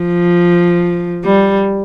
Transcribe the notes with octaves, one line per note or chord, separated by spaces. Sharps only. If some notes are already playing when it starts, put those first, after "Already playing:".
Already playing: F3
G3